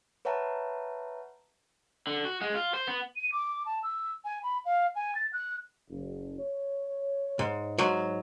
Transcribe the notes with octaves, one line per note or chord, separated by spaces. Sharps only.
B4 C#5 E5 F#5 A5 A#5
D3
F#4
G#3
F4
C5
B3
D#7
D6
A5
E6
G#5
B5
F5
G#5
A6
F#6
F#1
C#5
G#2
G#2 F#3